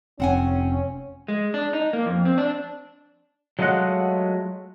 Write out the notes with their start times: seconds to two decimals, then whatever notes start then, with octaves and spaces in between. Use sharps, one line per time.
0.20 F1 C4 C#4 F#5 G#5
1.28 G#3
1.54 D4
1.73 D#4
1.93 A#3
2.06 F2
2.25 C4
2.38 D4
3.59 F#3 G#3 A3 F4 D#5 F#5